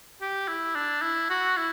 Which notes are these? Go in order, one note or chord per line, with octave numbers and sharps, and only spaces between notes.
G4
E4
D4
E4
F#4
E4